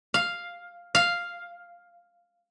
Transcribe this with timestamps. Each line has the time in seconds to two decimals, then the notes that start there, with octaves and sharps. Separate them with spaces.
0.14 F5
0.95 F5